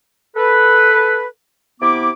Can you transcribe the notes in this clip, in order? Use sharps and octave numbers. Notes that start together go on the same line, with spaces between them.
A4 B4
C3 B3 E4 D6